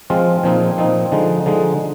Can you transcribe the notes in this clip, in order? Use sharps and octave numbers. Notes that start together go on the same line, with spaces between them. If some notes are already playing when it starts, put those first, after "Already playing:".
F3 G#3 C4 F4
A#2 F3 C4 D#4
A#2 F3 C4 D#4
D3 F3 G#3 D#4
D3 F3 G#3 D#4